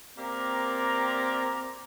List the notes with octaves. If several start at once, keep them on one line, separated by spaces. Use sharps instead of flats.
A#3 C4 G4 A#4 D5 A#5